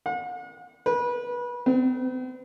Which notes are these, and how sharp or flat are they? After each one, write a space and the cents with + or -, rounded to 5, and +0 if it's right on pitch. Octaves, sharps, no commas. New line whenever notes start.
F#5 -40
B4 -25
C4 -45